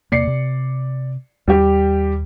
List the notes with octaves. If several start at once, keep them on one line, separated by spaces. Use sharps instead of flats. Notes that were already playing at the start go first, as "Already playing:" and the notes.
E2 C3 A#3 D5 C7 C#7
C3
D#2 G3 G4